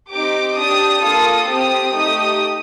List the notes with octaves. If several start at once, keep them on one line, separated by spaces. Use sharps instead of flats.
C4 D#4 G4 D6
D4 G4 D#6
A#3 F4 A4 D#6
C4 G4 D#6
A3 D#4 G4 D#6